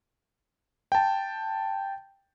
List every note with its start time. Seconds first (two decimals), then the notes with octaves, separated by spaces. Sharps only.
0.92 G5 A5